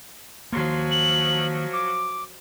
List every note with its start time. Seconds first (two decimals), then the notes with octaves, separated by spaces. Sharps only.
0.53 D#3 F3 F#3 A#3 C6
0.91 F#7
1.73 D6